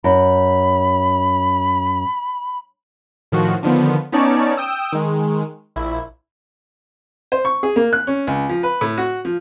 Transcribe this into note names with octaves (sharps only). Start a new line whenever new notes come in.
F#2 B5
A2 D#3 F3 F#4
D3 D#3 F3 B3
B3 C#4 D#4 C#5 D5 A5
G5 D#6 E6
D#3 G#3
A#1 E4
C5
C#6
G#4
A#3
F#6
C#4
C#2
F3
B4
A2
F#4
F3